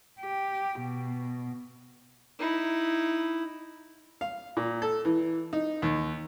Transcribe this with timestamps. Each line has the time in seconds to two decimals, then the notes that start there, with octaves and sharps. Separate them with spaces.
0.20 G4
0.80 B2
2.39 D#4 E4
4.21 F5
4.57 A#2
4.82 A4
5.05 E3
5.53 D#4
5.82 D#2